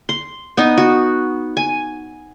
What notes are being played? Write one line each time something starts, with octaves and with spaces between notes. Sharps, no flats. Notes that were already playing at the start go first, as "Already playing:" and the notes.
C6
B3 D#4
F#4
G#5